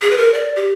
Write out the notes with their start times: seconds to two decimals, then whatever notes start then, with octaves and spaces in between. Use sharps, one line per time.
0.02 G#4
0.11 B4
0.17 A#4
0.34 D5
0.56 G4